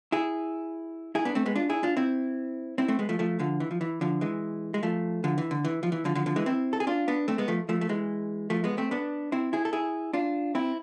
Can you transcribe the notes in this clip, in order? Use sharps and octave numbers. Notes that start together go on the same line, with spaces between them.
E4 G#4
E4 G#4
B3 D4
A3 C4
G#3 B3
D4 F4
E4 G#4
D4 F4
C4 E4
C4 E4
A3 C4
G#3 B3
F3 A3
F3 A3
D3 F3
E3
F3
E3
D3 F3
E3 G#3
G#3
F3 A3
D3 F3
E3
D3
E3
F3
E3
D3 F3
D3 F3
D3 F3
E3 G#3
C4 E4
A4
G#4
D4 F4
B3 D4
A3 C4
G#3 B3
F3 A3
F3 A3
A3
E3 G#3
F3 A3
G#3 B3
A3 C4
B3 D4
C4 E4
E4 G#4
A4
E4 G#4
D4 F4
C4 E4